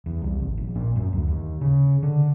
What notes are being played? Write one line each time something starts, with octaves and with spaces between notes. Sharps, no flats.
E2
C2
G#1
A#1
A#2
F#2
D2
D#2
C#3
D3